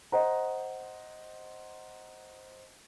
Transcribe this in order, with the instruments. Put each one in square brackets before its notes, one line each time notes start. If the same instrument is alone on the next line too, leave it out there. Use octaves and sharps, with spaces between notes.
[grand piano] C5 D#5 F#5 A#5